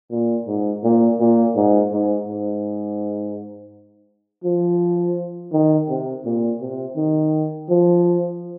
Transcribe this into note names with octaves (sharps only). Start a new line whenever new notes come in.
A#2
G#2
A#2
A#2
G#2
G#2
G#2
F3
D#3
C3
A#2
C3
D#3
F3